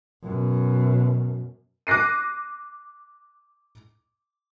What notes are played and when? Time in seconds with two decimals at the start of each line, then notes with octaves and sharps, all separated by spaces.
0.24 F#2 B2
1.87 D6 F#6 A#6 C7 D#7